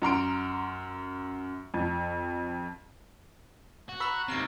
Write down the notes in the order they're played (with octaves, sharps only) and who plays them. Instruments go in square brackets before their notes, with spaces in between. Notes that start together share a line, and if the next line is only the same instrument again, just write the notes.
[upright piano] F#2 A#5 C6 D7
F2
[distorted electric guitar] F#4
[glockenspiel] A#5 C#6 [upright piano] B5 E6 B6
[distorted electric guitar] D#2 C3 [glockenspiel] C#6 F6 A#6